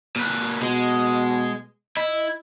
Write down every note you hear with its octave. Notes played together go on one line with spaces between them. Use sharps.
A#2 B4
B2 G#3
E4 D#5